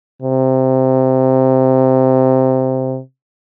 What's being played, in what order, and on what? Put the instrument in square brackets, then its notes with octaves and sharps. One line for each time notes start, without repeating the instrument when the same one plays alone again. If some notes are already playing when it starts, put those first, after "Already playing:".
[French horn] C3